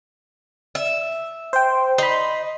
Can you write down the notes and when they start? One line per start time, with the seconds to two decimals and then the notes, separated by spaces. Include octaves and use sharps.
0.75 E5
1.53 C5 G5
1.98 D#4 B5 C6